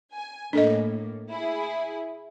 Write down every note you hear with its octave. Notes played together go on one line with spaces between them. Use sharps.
G#5
A2 A#3 D4 A4 D#5
E4 G#4